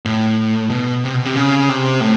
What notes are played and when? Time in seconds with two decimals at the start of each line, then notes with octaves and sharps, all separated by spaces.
0.05 A2
0.70 B2
1.04 C3
1.14 B2
1.25 C3
1.36 C#3
1.69 C3
2.01 A2